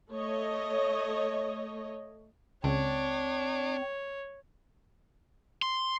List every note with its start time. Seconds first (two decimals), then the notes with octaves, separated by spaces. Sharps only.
0.12 A3 C#5 D#5
2.64 C#2 C4 D4 C#5
5.62 C6